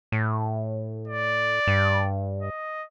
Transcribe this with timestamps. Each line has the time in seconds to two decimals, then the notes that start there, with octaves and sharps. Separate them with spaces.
0.12 A2
1.08 D5
1.67 G2
2.42 D#5